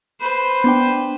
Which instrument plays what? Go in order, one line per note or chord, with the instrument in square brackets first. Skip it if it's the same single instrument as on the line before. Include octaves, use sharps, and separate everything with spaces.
[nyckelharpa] B4 C5
[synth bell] B3 D4 G5